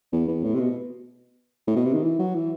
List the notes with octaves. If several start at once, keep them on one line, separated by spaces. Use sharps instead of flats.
E2
E2
A2
C3
B2
A2
B2
C3
D#3
E3
F#3
E3